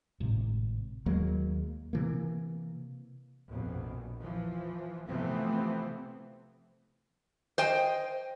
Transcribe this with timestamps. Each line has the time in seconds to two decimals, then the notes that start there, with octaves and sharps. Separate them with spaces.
0.20 G#1 A2 C3 G#3
1.06 D#2 F#3 G#3 A#3
1.93 C3 E3 A#3
3.50 A#1 F2 B2
4.22 E3 F3
5.07 C3 E3 F3 A3 B3 C4
7.58 C5 D#5 G5